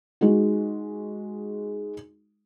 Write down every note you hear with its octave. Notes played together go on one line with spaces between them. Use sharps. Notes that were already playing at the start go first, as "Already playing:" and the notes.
G#3 D#4 F#4